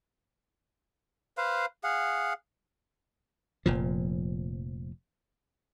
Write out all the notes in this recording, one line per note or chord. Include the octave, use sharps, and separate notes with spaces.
B4 C5 F5
G#4 F5 F#5
F1 A#2 F3